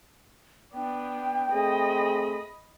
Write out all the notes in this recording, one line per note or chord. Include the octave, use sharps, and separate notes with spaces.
B3 D4 G5
A3 C4 G#4 D#5 B5